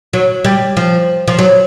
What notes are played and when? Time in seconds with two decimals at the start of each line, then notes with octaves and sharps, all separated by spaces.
0.13 F#3
0.45 G3
0.77 F3
1.28 F3
1.39 F#3